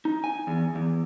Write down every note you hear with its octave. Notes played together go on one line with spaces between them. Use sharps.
D#4
G#5
E2
E2